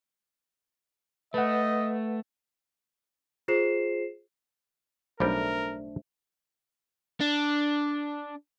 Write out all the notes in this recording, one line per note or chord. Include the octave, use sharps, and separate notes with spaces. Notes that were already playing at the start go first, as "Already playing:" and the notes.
A3 B4 D#5 F#5
F4 G#4 C5 C7 E7
B1 G3 A3 D4 A#4 C5 G5
D4